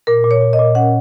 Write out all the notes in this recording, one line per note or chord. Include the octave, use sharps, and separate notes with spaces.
A#2 A#4
A#2
C#5
A#2
D#5
A#2
C#4 F#5